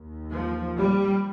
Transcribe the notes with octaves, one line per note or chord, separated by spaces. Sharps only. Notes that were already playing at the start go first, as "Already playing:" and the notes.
Already playing: D#2
F3
G3